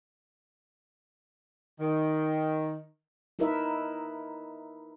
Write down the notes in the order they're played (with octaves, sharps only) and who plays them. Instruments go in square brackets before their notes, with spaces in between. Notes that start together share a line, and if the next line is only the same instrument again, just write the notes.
[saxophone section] D#3
[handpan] D#4 E4 A#4 B4 D#5 E5